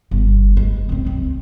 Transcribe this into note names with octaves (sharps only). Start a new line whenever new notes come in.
G1
G#3
F#2 C4
C#2 C4